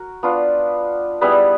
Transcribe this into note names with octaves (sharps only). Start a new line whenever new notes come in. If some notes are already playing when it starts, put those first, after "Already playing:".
Already playing: F#4 A#4
B3 D4 F4
G3 B3 E4 G#4